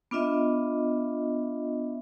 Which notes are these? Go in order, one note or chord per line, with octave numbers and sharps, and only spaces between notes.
B3 D4 F4 D#5 E5